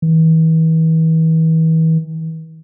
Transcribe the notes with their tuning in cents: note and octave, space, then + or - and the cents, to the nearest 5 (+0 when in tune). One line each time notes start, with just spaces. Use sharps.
E3 -40